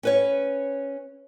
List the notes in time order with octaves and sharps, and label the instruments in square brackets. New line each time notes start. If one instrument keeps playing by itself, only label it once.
[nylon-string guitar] C#4 B4 C#5